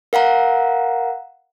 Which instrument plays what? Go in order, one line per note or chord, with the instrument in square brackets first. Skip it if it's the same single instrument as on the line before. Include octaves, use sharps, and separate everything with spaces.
[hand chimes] A#4 F5 F#5 A#5